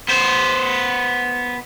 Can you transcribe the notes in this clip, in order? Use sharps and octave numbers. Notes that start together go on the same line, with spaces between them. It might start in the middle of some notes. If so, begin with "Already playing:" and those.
B3 C5